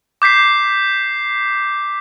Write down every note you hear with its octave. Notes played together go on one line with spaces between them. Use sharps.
D6 G6 B6 C7